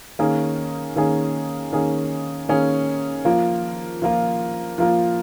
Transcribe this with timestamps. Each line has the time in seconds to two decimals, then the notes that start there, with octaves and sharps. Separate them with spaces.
0.19 D#3 A#3 C#4 G#4
0.96 D#3 A#3 C#4 G#4
1.72 D#3 A#3 C#4 G#4
2.49 D#3 A#3 C#4 G#4
3.25 F3 A#3 F4
4.02 F3 A#3 F4
4.78 F3 A#3 F4